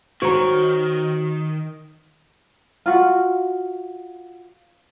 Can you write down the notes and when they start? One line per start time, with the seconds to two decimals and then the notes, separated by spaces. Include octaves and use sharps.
0.22 D#3 F#4 C5 C#5 A#5
2.86 F4 F#4